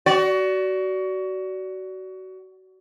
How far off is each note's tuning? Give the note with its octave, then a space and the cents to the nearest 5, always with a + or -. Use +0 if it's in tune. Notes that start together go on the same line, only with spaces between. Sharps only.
F#4 +25 D5 -15